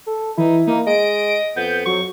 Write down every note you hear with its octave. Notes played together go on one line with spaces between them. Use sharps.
A4
E3 D#4 E4
A#3 D#4
G#3 D#5 D7
F2 B3 G6
F#3 C#6